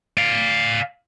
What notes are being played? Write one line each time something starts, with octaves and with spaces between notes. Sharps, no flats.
D5 F5